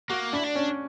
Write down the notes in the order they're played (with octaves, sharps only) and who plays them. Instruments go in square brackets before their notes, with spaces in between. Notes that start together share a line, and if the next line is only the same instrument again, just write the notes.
[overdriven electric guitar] A#3 [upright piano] F#4
[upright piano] D4 [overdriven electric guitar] E4
[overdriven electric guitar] D4
[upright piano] C#4